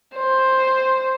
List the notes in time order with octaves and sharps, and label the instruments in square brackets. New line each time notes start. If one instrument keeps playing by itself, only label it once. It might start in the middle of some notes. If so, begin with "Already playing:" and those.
[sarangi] C5